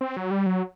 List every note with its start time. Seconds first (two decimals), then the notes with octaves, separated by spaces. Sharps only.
0.01 C4
0.17 F#3
0.31 G3
0.46 F#3